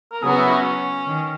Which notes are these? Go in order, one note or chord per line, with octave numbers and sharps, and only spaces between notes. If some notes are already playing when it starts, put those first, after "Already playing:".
A#4
C#3 F#3 B3 F#4 G#4
E4
C#4
D#3